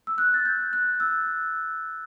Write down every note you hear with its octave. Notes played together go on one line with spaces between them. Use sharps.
E6
F#6
A6
G6
F#6
E6